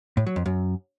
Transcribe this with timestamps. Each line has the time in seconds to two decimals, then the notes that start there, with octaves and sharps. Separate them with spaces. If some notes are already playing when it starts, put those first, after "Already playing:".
0.17 A2
0.27 F#3
0.36 F2
0.46 F#2